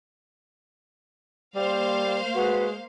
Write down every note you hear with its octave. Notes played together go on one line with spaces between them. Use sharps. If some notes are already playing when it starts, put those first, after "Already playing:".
G3 A#3 C5 F5
G#3 F#4 B4